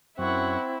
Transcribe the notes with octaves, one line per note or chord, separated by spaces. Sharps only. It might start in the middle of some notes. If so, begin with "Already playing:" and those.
F#2 C4 E4 F#5 C#6